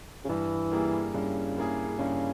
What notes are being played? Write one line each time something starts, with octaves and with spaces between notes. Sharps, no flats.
C#3
G2 E3
G3 A#3 E4 G#4
G2 C#3
G3 A#3 E4 G#4
G2 C#3